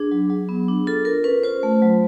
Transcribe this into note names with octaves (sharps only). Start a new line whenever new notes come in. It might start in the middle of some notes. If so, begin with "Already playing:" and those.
Already playing: D4 G#4
F#3
F#3
B3
D4
F4 A4
F4 A#4
C#4 B4
F4 C5
A3
F#3